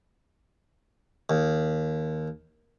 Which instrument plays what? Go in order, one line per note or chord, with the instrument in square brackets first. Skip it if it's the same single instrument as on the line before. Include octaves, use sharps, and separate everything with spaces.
[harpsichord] D#2